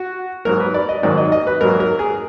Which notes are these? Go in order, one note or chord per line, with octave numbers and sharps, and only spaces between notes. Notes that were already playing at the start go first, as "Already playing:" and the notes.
Already playing: F#4
G#2 F#3 A#3 A#4
B4
D5
D#5
G#2 D#3 F#3 A#3 D5
D#5
D#5
B4
G#2 F#3 A#3 A#4
A#4
G#4